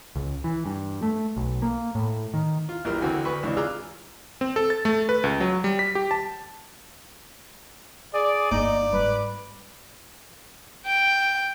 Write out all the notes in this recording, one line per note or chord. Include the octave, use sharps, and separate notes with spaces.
C#2
E3
G2
A3
B1
A#3
A2
D#3
F4
A#1 E3 G3 F4 A#4
D2 D3 E3 C4 F#4 G#5
D2 B4 B5 C#6
G#1 C#2 E3 D4
F4 G#4 A#5 D6 E6 F#6
C4
A4
A6
A3
B4
C#2
F#3
G3
B6
G4
A5
G#4 D5
G1 A#3 D#4 D5
G#2 G3 B4
G5